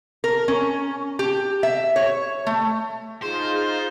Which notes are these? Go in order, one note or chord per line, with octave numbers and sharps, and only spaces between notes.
A#4
C#4
G4
E5
C#5
A3
D#4 F4 G#4 C5